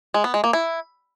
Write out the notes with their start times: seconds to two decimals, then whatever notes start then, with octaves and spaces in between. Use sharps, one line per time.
0.14 G#3
0.24 B3
0.34 G#3
0.44 A#3
0.53 E4